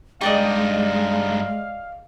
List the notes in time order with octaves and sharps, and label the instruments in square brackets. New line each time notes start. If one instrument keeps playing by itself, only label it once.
[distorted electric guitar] G2 D#4 [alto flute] G#3 [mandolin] G4 D5 D#5 [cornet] F5